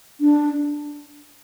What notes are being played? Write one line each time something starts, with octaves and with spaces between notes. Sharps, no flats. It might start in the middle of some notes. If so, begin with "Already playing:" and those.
D4